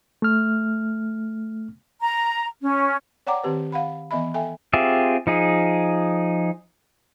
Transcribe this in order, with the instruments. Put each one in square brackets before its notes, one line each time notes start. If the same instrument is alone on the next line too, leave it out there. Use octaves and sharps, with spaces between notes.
[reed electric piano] A3 F6
[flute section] A#5
C#4
[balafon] C#5 D5 F#5 G5 A#5 D6
D#3 C4 G4 B4
F5 F#5 B5
E3 B3 D#5 E5 B5
A4 E5 G5 G#5
[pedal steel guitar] C4 F4 G4 G#4 E5
F3 D#4 G#4